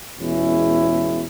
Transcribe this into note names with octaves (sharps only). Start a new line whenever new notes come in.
E2 B2 G#3 C#4 E4